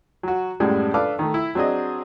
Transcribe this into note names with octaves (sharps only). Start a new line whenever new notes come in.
F#3 F#4
F#2 A2 G3 G#3
D4 A4 B4 F5 D6
D#3 A3
E4
F#3 C4 D4 G#4 D#5